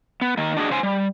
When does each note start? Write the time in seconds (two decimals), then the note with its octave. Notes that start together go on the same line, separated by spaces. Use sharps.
0.21 B3
0.37 D#3 A#3
0.57 D4 F#4 G#4 D#5
0.70 C#3 C5 G#5
0.83 G3